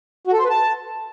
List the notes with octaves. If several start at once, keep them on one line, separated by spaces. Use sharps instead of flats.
F#4
A4
C5
B4
A5